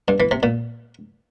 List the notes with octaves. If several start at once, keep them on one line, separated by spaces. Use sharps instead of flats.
G2
E3
C3
A#2